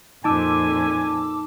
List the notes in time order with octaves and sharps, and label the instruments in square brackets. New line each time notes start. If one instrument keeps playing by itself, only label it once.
[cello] F2 A#2 [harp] D#4 [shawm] G#5 [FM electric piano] A5 D6 E6